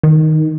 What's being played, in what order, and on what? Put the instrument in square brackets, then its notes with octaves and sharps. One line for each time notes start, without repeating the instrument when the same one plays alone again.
[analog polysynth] D#3